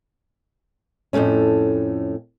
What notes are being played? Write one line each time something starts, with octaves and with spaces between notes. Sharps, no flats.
F2 A2 C3 A3 C#4